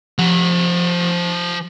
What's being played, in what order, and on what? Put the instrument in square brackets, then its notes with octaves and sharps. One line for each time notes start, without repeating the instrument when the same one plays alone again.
[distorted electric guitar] F3 F#5